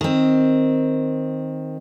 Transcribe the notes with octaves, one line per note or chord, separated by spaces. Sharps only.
D#3 C4